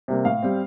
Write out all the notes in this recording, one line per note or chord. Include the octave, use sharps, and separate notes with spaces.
C3 G3 A#3
A2 F5
G3 C4